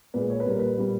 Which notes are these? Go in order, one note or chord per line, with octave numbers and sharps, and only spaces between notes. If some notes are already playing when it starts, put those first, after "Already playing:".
A#2 G#3 B4
C#5
B4
A#2 G3 A#3 A#4
B4
A#2 G3 A#3